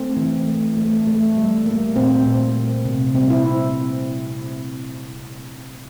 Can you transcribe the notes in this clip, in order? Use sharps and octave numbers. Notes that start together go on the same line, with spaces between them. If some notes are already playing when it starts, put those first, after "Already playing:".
Already playing: A3 C4
E3
A3
A3
A3
G3
A#3
A#2 C4
A#2
A#3
C3
G3 C4
E4